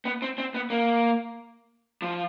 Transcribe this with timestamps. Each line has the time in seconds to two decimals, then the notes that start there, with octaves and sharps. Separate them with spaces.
0.05 B3
0.22 C4
0.38 C4
0.54 B3
0.70 A#3
2.02 F3